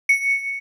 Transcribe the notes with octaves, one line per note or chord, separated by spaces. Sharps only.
C#7